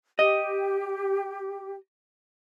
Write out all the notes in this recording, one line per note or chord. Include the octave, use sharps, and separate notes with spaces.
G4 D#5